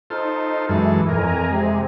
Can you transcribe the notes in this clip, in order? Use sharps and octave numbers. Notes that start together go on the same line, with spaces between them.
D#4 F4 A4 C5
F#2 E3 G#3 A4
F2 A#4 G#5 A#5
C3 G#3